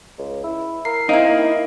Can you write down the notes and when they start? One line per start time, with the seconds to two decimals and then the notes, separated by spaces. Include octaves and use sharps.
0.18 C#2
0.44 E4
0.85 A#4 C7
1.09 C4 D#4 E4 D#5 F5 D7
1.28 A#3